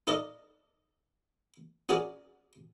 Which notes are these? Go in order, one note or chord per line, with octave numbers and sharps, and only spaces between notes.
D#4 A4 A#4 D5 D#5
C#4 F#4 G#4 A#4 D5